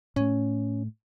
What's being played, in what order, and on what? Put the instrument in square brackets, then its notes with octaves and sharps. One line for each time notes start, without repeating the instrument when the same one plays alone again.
[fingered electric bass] A2 A3 [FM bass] C#4